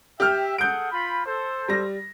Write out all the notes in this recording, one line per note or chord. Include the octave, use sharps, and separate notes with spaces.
G4 E5 G5 F6
G#4 A4 F#5 G6 D7
F4 B5
A4 C5
G3 A#6